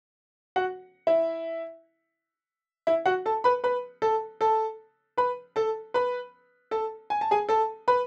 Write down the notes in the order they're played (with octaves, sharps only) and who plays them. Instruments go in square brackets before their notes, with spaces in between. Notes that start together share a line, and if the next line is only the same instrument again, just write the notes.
[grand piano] F#4 F#5
E4 E5
E4 E5
F#4 F#5
A4 A5
B4 B5
B4 B5
A4 A5
A4 A5
B4 B5
A4 A5
B4 B5
A4 A5
G#5
A5
G#4 G#5
A4 A5
B4 B5